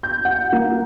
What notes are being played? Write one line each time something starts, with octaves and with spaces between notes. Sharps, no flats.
G6
F#5
A#3